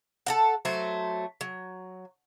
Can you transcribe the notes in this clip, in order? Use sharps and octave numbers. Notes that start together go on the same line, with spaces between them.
A4 A#4 F#5
F#3 A3 C5
F#3